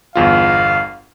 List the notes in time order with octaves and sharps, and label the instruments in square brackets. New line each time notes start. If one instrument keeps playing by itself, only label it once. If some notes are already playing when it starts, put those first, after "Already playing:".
[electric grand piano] G1 E2 F4 [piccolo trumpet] F5